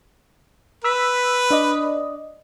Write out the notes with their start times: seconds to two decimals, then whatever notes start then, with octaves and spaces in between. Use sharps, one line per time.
0.84 B4 E6 B6
1.51 D4 D5 D#5